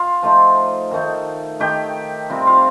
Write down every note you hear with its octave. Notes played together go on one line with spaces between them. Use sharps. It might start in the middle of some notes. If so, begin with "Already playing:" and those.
Already playing: F4 F5
F3 A3 D#4
D#3 A3 D#4
D#3 A3 D#4 G4 G5
C3 G3 C4 F4
F4 F5